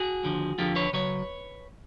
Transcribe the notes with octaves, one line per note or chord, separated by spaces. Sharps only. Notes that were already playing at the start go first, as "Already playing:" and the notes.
Already playing: F#4 G#4
D#2 D3 F3
F2 D3 F3 F4 G4
B4 C#5
C#3 F#3 B4 C#5